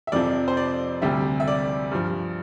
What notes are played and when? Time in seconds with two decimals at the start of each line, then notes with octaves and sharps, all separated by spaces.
0.07 E5
0.12 F2 C3 F3 D5
0.48 C5
0.57 D5
1.02 D2 C3 G3 E5
1.40 E5
1.48 D5
1.91 G2 F3